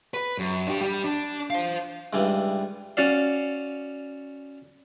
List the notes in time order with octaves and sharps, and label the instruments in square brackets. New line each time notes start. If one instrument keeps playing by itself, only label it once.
[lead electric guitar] B4
F#2
D4 G4
G3
D4
C5 F5
[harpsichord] C#2 G2 E3 G3
C#4 F#4 D5 F5